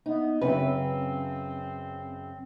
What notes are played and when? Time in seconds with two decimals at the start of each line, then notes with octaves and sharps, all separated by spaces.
0.06 B3 D#4
0.41 F#2 C#3 C4 B4